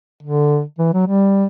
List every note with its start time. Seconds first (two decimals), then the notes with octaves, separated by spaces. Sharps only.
0.23 D3
0.79 E3
0.94 F#3
1.07 G3